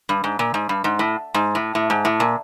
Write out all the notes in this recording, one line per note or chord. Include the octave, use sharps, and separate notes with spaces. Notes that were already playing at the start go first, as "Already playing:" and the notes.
G2
G#2
A#2
G#2
G2
G#2
A2
G#2
A2
A2
G#2
A2
A#2